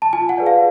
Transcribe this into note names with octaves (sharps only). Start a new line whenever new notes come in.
A5
F4 G#5
F#5
G#4 B4 D5
F5